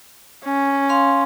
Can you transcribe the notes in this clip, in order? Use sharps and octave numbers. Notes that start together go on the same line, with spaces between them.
C#4
F5 C6